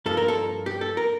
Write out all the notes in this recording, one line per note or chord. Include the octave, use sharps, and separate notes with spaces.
G2 F3 A#3 A4
A#4
A4
G4
A4
A#4